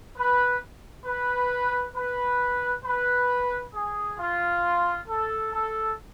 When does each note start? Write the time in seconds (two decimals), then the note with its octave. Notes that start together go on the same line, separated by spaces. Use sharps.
0.17 B4
1.05 B4
1.95 B4
2.85 B4
3.73 G#4
4.18 F4
5.08 A4
5.52 A4